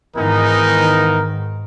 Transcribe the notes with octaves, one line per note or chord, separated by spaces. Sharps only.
G#2 D#3 E3 B3 D#4 A#4